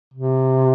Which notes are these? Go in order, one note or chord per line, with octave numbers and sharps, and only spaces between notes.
C3